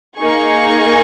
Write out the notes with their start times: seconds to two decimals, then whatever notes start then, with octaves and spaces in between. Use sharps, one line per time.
0.18 A#3 D#4 G#4 G#5 C#6